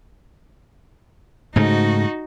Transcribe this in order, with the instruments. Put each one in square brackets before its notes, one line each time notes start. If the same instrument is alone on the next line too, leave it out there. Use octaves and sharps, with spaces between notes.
[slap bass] G#2 C#3 A3 [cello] D#4 F#4